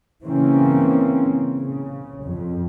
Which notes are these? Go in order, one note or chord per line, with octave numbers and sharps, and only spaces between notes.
C#3 E3 A#3 C4 C#4
C#3
F2